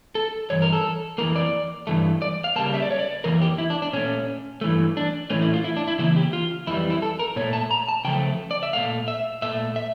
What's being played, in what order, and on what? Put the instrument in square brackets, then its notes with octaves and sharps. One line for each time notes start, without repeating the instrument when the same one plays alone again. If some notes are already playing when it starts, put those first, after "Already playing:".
[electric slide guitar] A4
G2 E3 C#5
A#4
A4
F2 E3 A#3 A#4
D5
G2 E3 A3
D5
F5
C#3 G3 A#3 A5
E5
D5
C#5
D5
F2 E3 A#3 A#4
G4
E4
D4
D4
A#2 A3 C#4
G2 E3 A3
D4
A2 E3 A3 C#4
E4
F4
E4
D4
E4
C#3 E3 A#3 E4
G4
F4
F2 E3 G3 E4
E4
A4
A#4
A#2 C#5
A3
A5
A#5
A5
C#3 F3 A3 G5
D5
E5
A#2 A3 F5
E5
A#2 A3 E5
E5